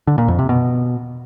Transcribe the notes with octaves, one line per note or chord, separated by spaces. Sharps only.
D3
A#2
F2
C3
B2